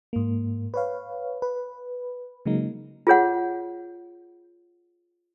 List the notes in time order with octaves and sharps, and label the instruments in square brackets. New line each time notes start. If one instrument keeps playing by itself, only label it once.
[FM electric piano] G#2 A#3
B4 C#5 F5
B4
C#3 F#3 G#3 A#3 D#4
[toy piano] F4 G#4 C#5 F#5